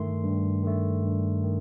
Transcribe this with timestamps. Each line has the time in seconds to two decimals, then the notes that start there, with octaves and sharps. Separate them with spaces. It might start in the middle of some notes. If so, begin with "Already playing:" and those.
Already playing: G2 D#3 A3 C6
0.23 G2
0.63 D#3 A3
1.03 G2
1.44 D#3 A3